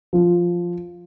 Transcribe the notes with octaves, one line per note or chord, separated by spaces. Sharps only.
F3